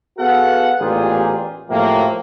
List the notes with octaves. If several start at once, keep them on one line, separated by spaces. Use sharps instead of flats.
B3 F#4 G#4 A4 F5 F#5
A1 A#2 B3 F4 G4 G#4
A2 C3 F3 F#3 A#3